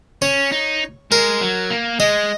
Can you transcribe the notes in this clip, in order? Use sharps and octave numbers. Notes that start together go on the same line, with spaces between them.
C#4 C#5
D#4
G#3 A#4
F#3
A#3
G#3 D#5